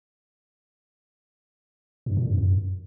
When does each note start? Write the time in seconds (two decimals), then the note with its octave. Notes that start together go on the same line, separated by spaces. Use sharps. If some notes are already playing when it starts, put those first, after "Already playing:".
2.06 G2
2.17 A#2
2.27 F2
2.38 F#2